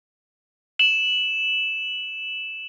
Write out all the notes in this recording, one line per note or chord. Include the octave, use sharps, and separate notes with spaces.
E7 F#7